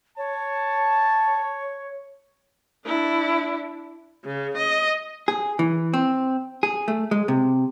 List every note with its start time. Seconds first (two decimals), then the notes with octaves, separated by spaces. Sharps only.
0.17 C#5 A5
2.86 D4 E4
4.26 C#3
4.57 D#5
5.28 G#4
5.59 E3
5.94 C4
6.63 G#4
6.88 A3
7.11 G#3
7.28 C3